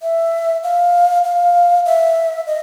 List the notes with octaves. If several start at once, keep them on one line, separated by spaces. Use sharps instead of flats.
E5
F5
F5
E5
D#5